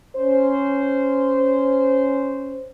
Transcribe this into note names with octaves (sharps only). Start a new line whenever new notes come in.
C#4 C5